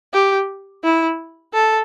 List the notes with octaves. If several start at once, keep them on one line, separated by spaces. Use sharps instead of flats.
G4
E4
A4